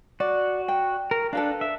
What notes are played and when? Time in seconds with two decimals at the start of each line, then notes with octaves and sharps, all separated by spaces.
0.20 F#4 D5
0.68 G5
1.11 A#4
1.33 D4 A4 B4 F5
1.61 E5